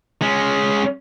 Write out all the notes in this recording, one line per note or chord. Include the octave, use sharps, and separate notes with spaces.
G#3 C#4